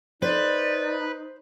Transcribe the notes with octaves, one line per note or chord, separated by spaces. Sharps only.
D#4 B4 C5 D5